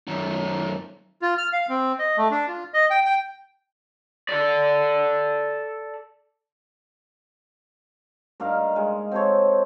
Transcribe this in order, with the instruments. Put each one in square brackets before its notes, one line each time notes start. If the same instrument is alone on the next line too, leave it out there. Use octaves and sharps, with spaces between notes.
[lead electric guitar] F#2 D#3
[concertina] F4
F6
F5
C4
D#5
A3
D4
F4
D#5
G5
G5
[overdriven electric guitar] A4 D5
[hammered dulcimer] G2 A#3 D#4 F5
G#3
C4 A4 C#5